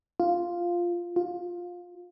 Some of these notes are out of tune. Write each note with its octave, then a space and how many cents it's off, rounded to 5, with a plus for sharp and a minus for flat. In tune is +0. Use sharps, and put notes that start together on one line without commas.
F4 +0
F4 +15